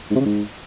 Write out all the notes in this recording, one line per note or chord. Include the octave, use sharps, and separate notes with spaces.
G#2
C3
C#3
G#2